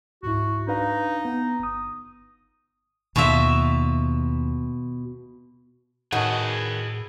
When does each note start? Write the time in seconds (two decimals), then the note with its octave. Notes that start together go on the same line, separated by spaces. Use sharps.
0.23 C#2 G#2 E4 F#4
0.68 D4 D#4 B4 F5
1.25 B3
1.59 G1 D#6
3.16 D#2 B2 F4 E5
6.12 A2 D#3 F#4 G#4 B4 C#5 F#5 A5